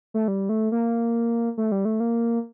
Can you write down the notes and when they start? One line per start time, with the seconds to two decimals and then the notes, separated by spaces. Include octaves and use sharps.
0.14 A3
0.28 G3
0.49 A3
0.72 A#3
1.58 A3
1.72 G3
1.85 A3
2.00 A#3